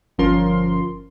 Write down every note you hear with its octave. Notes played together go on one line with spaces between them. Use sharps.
G1 F3 C#4 F4 A#4 C6